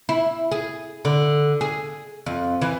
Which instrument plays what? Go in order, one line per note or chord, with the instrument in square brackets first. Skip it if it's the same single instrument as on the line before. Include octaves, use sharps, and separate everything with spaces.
[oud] E4
G#4
D3
G#4
F2
E3